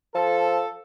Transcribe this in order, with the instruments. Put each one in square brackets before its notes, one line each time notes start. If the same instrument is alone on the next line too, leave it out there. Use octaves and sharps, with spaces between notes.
[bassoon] F3 [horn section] A4